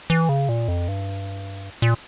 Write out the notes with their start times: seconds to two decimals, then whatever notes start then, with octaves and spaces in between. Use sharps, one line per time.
0.10 E3
0.29 C#3
0.49 A#2
0.68 F2
0.88 G2
1.82 A#2